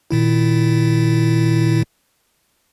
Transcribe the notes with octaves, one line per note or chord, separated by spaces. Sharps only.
A#2 D#3 E4